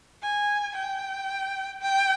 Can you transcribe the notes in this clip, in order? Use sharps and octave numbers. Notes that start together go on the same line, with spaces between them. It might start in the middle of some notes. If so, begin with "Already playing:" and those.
G#5
G5
G5